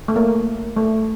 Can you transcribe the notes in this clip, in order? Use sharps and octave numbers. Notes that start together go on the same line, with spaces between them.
A3
A#3
A3